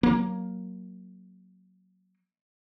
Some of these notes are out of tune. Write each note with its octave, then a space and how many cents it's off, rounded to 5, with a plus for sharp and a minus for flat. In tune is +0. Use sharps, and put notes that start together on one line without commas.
F#3 +5 A#3 +0